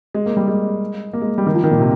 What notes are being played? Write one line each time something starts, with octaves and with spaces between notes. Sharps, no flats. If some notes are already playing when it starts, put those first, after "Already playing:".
G#3
A#3
G3
G#3
A#3
G#3
G3
D#3
F3
D#3
A#2
C3